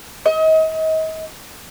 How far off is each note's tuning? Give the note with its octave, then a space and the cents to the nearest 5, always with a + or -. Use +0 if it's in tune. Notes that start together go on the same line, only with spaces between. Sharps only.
D#5 +35